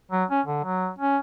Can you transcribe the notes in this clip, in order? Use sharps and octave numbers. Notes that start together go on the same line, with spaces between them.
F#3
C#4
D3
F#3
C#4